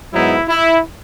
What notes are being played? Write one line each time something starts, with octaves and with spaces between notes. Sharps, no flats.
G#2 F#3 B3 D#4 E4
E4